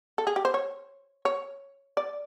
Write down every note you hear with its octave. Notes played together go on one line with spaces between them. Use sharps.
A4
G#4
G4
C5
C#5
C#5
D5